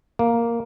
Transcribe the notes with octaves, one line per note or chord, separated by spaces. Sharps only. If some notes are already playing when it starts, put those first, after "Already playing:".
A#3